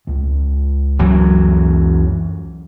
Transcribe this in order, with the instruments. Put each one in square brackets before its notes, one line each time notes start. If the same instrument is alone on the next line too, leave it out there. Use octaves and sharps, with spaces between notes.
[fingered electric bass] C#2 G#3
[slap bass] F#2 E3 F#3